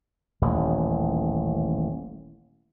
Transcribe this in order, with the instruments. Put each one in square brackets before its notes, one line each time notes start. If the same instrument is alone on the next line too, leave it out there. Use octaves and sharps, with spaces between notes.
[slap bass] D#1 A1 D#2